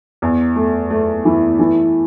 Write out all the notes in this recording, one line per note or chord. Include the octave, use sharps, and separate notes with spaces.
E2
A3
A3
E3
E3